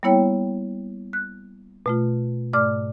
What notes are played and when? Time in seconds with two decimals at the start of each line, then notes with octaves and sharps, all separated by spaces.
0.03 G3 A#3 B3 E4 C#5 G5
1.13 F#6
1.86 B2 A3 F4
2.53 G#2 A3 D5 D6 F6